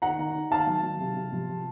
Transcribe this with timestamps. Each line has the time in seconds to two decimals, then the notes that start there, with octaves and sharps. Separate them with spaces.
0.02 D#3 F#5 A#5
0.19 D#3
0.35 D#3
0.51 D#3 F5 A5
0.67 F#3
0.83 F#3
1.00 C3
1.15 C3
1.32 F3
1.48 C3